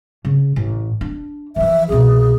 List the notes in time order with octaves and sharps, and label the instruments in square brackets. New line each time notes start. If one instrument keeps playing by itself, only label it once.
[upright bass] C#3
A1
D4
[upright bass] E3 F3 [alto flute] E5
[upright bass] C2 B2 [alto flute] G#4